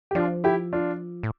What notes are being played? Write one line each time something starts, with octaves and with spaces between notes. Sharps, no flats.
G4
F3 D4 F4
E4 G4
D4 F4
A2